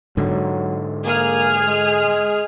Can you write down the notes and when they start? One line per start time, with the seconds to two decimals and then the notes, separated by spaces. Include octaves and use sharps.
0.17 G#2 D3 F#3
1.05 A#3 G#4 F6
1.68 G#3